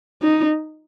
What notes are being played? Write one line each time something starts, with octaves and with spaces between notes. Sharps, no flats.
D#4